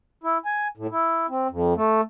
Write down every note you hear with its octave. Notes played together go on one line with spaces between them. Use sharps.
E4
G#5
A2
E4
C4
F2
A3